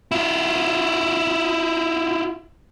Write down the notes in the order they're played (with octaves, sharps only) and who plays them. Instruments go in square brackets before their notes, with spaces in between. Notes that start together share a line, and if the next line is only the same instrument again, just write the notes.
[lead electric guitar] E4 F4